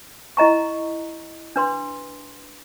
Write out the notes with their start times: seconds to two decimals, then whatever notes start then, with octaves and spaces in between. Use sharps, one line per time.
0.37 E4 D#5 A#5 C#6
1.56 D4 B4 C6